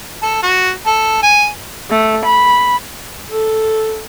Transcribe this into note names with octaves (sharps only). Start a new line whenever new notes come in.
A4
F#4
A4
G#5
A3
B5
A4